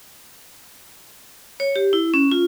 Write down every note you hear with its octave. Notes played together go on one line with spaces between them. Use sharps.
C#5
G4
E4
C#4
F4